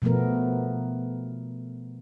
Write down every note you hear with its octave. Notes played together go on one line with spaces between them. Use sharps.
B2 F3 A3 B3 A#4